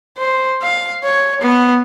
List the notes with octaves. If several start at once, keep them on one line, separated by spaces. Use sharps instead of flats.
C5
F5
C#5
B3